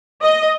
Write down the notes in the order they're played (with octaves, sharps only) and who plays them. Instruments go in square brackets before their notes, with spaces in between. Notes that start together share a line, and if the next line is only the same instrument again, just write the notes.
[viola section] D#5